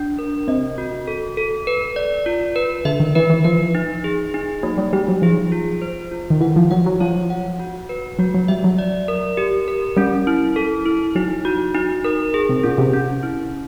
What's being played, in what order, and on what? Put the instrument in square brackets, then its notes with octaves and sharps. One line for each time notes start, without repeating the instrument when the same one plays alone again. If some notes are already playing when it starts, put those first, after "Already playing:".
Already playing: [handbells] D4
A#4
[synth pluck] C3 [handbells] D#5
[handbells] F#4
A4
A4
B4
D5
F4
B4
[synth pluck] D3 [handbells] E5
[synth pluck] D#3
[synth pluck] E3 [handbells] B4
[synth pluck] E3
[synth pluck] F3 [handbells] B4
[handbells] D#4
G#4
D#4
[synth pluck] F#3 [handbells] A#3
[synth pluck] G3
[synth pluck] G3 [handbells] D#4
[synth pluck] F#3
[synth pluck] F3 [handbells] G#4
[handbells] F4
C5
F4
[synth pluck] D#3
[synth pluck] E3 [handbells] F#5
[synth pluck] F3
[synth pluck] F#3 [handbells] F#5
[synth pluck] F#3
[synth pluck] F3 [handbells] C#5
[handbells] F#5
F#4
B4
[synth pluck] F#3 [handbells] F#4
[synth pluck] F#3
[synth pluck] G3 [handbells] E5
[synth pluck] F#3
[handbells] D5
A#4
G4
A#4
[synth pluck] G3 [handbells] C#4
[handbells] E4
A4
E4
[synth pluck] F#3 [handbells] D#4
[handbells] F#4
D#4
A#4
G#4
[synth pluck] C3
[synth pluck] A#2 [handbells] C#4
[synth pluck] C3
[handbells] C#4
E4